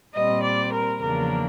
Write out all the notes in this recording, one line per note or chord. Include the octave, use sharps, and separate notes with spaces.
A#2 G3 C4 D#5
D5
A#4
E2 C#3 F3 A#3 D4 A#4